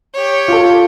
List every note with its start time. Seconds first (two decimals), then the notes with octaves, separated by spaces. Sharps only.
0.14 G4 C#5
0.48 F4 A4